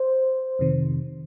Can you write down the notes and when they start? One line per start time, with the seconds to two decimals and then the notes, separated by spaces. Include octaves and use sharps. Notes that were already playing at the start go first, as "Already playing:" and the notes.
Already playing: C5
0.59 F2 C3 D#3